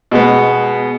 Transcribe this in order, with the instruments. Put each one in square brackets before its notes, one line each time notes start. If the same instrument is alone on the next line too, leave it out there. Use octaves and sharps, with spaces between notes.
[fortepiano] B2 G#3 B3